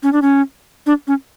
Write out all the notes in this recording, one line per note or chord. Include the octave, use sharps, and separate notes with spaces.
C#4
D4
C#4
D4
C#4